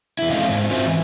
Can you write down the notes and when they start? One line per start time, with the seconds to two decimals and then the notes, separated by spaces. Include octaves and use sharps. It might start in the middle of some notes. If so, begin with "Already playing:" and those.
0.19 E2 E4
0.30 G#3 A3 C4 C#4 D#5 F5
0.48 G#2 C4
0.70 C#4 F4 F#4 C5 E5
0.85 E3